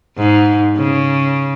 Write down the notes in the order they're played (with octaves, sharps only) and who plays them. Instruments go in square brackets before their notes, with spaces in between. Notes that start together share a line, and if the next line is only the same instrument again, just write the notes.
[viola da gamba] G#2
C#3